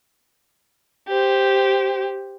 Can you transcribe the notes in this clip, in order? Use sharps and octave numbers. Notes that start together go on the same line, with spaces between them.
G4 C5